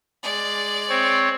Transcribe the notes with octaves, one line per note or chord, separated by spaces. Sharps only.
G#3 D5
C4 C#5